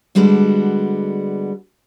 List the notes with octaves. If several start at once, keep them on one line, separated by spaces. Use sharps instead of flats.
D3 G3 G#3 B3 F#4 A4